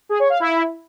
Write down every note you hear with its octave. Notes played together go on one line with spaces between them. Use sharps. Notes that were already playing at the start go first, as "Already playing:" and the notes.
G#4
C#5
F5
E4